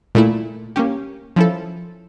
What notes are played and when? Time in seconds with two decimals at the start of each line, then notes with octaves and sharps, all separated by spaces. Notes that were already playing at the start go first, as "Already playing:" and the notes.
0.15 A#2 A3 E4
0.76 A#3 C#4 G4
1.36 F3 C#4 E4 A4